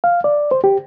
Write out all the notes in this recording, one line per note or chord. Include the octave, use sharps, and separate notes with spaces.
F5
D5
C5
G4